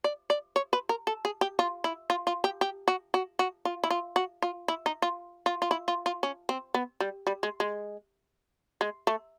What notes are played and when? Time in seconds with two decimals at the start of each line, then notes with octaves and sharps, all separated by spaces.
0.04 D5
0.30 D5
0.56 C#5
0.73 B4
0.89 A#4
1.07 A4
1.25 G#4
1.41 G4
1.59 F4
1.84 E4
2.10 F4
2.27 F4
2.44 G4
2.61 G4
2.88 F#4
3.14 F#4
3.39 F#4
3.65 F4
3.84 E4
3.90 F4
4.16 F#4
4.42 F4
4.68 E4
4.86 D#4
5.02 F4
5.46 F4
5.62 F4
5.71 E4
5.88 F4
6.06 F4
6.23 C#4
6.49 C4
6.74 B3
7.00 G3
7.27 G3
7.43 G#3
7.60 G#3
8.81 G#3
9.07 A3